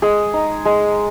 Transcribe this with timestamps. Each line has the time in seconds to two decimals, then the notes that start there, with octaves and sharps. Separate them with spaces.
0.02 G#3 G#4
0.33 D#4
0.65 G#3